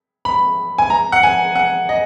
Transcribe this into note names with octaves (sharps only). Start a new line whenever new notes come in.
B5
G#5
A#5
F#5
G#5
F#5
D#5